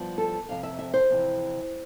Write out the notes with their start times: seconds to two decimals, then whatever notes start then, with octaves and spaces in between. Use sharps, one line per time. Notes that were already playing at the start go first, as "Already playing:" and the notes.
Already playing: G2 F3 B3
0.18 A4
0.49 F2 C3 F5
0.63 E5
0.79 E5
0.94 C5
1.09 F2 C3 E3